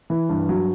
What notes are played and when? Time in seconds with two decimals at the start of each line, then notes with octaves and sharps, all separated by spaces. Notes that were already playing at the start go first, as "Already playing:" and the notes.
0.10 E3
0.29 G2
0.49 F#3